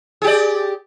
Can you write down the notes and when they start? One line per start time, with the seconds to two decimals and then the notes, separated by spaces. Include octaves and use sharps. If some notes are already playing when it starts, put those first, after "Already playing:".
0.22 G#4
0.24 G4
0.27 D5